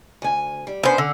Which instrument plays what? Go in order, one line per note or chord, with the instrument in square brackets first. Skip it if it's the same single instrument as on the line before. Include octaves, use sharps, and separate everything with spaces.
[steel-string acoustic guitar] D2 G#5
G3
[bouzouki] B3 C5 [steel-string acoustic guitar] C#4 D4
[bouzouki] D3